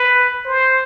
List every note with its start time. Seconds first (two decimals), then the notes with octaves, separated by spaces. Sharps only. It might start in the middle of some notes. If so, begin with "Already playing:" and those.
Already playing: B4
0.45 C5